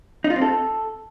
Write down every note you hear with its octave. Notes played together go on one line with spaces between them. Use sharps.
D#4
F4
C4
A4